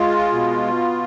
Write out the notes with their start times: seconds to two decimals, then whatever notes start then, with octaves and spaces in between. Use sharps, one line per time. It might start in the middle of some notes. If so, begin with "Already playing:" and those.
Already playing: G#3 F4
0.32 B2